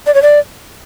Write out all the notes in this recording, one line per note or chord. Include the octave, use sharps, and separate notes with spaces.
D5
C#5
D5